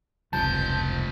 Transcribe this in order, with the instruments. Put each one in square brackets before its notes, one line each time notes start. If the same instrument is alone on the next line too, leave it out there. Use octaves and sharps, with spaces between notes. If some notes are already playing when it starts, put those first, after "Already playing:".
[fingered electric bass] F1 C#2 G2 [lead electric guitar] C3 F3 [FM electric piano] A5 [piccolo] G6